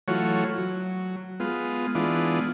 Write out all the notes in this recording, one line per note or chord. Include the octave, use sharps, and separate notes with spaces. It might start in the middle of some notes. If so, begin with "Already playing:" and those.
E3 F#3 A3 F4 F#4 C#5
F#3
G#3 B3 F4
E3 G#3 B3 D4 F4